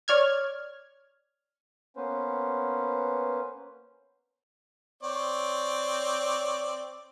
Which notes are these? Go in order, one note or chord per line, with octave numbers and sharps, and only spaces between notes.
C#5 D5 F6 G#6
A#3 B3 C#4 B4 C5
C4 C#5 D5